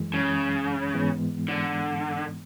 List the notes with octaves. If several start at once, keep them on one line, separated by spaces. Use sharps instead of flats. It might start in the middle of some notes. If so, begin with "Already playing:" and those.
Already playing: F#2 E3 G#3
C#3
G#2 E3 G#3 B3
D3